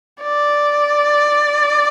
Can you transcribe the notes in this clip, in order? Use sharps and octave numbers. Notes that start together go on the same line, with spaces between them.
D5